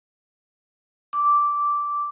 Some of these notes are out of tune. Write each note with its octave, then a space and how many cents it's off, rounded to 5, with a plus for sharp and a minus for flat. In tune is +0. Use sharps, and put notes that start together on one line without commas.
D6 -10